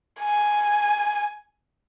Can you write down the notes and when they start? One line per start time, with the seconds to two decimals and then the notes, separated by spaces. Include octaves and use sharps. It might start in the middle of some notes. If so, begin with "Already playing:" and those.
0.21 G#5